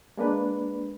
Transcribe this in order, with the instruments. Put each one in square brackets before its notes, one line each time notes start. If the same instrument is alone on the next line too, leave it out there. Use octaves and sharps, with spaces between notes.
[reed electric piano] G#3 A#3 D4 B4